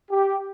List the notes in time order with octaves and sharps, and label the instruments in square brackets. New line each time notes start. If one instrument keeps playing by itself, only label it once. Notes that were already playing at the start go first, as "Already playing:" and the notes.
[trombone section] G4